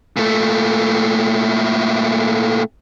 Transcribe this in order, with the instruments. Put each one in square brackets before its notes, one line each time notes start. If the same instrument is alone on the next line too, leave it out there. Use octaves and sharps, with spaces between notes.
[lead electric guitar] A#2 A3